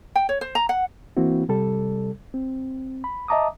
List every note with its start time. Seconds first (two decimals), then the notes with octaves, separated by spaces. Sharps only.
0.16 G5
0.29 C#5
0.41 C5
0.55 A#5
0.69 F#5
1.17 E3 A#3 C4 E4 F#4
1.49 C3 G3 A4
2.34 C4
3.04 B5
3.28 D#5 E5 A5 A#5 D6 D#6